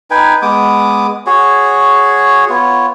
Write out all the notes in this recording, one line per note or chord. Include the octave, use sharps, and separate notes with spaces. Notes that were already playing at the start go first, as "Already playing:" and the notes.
D#4 B4 G5 G#5
G#3 B3 D6 D#6
F#4 G#4 C#5
B3 F4 C#5